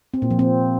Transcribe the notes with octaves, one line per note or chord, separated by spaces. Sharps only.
C4
A#2
F3
C4